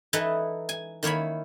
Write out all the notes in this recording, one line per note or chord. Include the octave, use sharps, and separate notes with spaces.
E3 D#4 E4 A4 B4 D#5
G#5
D#3 A#3 E4 C#5 B5